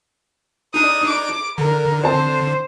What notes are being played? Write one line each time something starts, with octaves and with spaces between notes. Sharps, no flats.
D4 D#4 D#6
D6
D3 A#4
C4 C5 A5